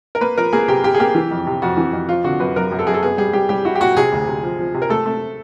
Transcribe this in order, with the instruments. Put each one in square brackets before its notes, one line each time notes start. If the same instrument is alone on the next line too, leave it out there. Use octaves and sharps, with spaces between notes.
[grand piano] A#4
[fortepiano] A#3 [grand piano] B4
[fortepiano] F3 [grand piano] A#4
[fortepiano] A#3 [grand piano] G#4
[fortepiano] C3 [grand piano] G4
[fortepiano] C3 [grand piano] G4
[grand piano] G#4
[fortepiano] A#3 [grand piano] G4
[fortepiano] E3
F2
C3
[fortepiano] F2 [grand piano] F#4
[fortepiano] E3
F2
[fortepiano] F3 [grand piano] F4
[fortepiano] D3 [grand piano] F#4
[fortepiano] F#2 [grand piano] B4
[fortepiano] F#2 [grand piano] A#4
[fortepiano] F#2
[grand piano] A4
[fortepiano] F#2 [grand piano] G#4
[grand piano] A4
[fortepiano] B3 [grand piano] G#4
[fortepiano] G3 [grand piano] G#4
[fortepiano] G3 [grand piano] G4
[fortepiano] G3 [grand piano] G4
[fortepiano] E4 [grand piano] F#4
[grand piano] G4
[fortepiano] A#2 [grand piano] F#4
[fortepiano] C3 [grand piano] G#4
[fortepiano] D2
C3
F3
F3
C3
[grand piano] A#4
[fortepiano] A3 [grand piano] A4
[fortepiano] A3